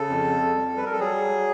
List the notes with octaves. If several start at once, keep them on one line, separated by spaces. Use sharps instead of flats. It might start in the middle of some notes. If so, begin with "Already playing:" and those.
Already playing: C#3 A4
F2
G3
B4
A#4
A4
F#3 G#4